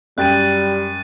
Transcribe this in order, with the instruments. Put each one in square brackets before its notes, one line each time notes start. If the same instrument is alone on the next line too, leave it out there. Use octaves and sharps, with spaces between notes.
[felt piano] F#2 G5 [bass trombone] G3 [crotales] F#6 A6 D#7